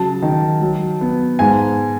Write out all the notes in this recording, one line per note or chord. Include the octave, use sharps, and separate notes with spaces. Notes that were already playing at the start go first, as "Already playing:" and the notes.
Already playing: C#3 F#3 A5
D#3
F#3
B3
G#2 G#5